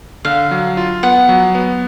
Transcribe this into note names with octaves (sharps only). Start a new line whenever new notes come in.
D3 F5
F#3
F4
B3 F#5
F#3
B3